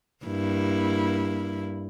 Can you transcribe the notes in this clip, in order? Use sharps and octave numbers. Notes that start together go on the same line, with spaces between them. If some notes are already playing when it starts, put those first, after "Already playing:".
G2 A#3 E4